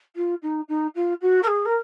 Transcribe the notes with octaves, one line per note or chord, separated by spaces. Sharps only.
F4
D#4
D#4
F4
F#4
A#4
G#4
A#4